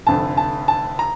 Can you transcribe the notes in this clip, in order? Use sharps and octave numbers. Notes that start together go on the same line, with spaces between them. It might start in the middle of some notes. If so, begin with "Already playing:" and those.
F1 F2 D3 A5
A5
A5
A#5